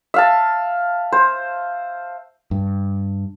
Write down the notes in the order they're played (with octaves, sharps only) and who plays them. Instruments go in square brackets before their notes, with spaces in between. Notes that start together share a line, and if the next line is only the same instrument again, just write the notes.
[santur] E5 F5 A5
C5
[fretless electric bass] G2